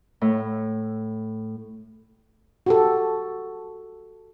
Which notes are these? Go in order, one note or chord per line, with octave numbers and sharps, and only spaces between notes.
A2
F#4 G4 A4